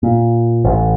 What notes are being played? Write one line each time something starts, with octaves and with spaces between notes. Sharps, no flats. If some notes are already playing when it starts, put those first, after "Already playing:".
A#2
A1